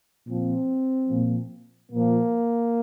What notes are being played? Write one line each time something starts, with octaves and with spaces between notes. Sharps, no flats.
A#2 F3 C4
A#2 F3
A#2 F3 A#3